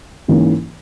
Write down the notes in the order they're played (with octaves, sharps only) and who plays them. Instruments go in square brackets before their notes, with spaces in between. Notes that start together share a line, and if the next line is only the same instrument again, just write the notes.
[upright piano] G#2 E3 A#3 C#4